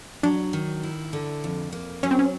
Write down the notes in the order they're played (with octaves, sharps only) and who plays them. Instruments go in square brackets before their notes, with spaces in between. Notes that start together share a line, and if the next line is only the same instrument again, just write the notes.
[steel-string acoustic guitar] F#3 [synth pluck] D4
[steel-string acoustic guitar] D#3
E4
D3
F2
A#3
[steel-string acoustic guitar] F#3 [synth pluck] C#4
[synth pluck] C4
C#4